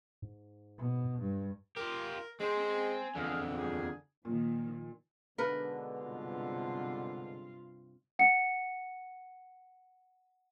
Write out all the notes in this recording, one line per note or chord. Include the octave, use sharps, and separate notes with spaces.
G#2
B2
G2
F4 G4 A#4
G#3 C4 C5 G#5
F2 D3 E3 G#4 F5
G3 A#3 G#4
A#2 D#3 F3
G#2 B2 D3 A#4 B4
G2 C3 F4
F#5 C#7